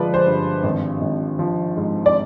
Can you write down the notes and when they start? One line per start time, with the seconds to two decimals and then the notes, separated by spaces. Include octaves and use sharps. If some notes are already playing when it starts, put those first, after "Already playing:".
Already playing: G1 F3 G#3 B4 D5
0.14 C5
0.27 G2
0.63 G#1
1.02 G#1
1.39 F3
1.77 G#2
2.06 D5